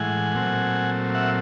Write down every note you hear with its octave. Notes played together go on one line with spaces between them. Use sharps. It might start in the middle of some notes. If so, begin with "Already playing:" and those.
Already playing: A2 E3 G#3 F#5 G#5
A#2 F#3 A3 C4
E5 F#5